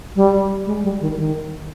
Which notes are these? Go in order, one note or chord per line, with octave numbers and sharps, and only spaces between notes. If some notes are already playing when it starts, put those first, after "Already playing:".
G3
G#3
G3
D#3
D#3